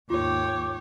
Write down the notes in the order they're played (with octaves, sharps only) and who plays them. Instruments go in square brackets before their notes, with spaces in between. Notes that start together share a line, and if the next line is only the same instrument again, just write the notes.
[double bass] D#2 G#2 [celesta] F4 [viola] C#5 G5 [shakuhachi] D6